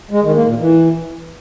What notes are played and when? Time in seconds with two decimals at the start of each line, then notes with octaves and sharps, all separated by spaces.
0.11 G#3
0.23 D#3
0.35 A#3
0.47 A#2
0.59 E3